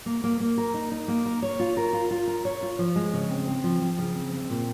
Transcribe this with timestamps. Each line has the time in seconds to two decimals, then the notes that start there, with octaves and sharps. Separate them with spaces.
0.06 A#3
0.24 A#3
0.40 A#3
0.58 A#4
0.74 D#4
0.92 D#4
1.08 A#3
1.25 A#4
1.42 C#5
1.60 F4
1.77 A#4
1.93 F4
2.11 F4
2.27 A#4
2.45 C#5
2.62 F4
2.79 F3
2.96 G#3
3.14 C#3
3.30 C4
3.47 C4
3.64 F3
3.82 F3
3.99 C#3
4.15 C4
4.33 C4
4.50 A#2